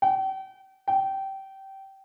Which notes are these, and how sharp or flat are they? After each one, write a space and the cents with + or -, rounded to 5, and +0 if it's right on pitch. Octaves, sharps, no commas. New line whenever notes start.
G5 -40
G5 -20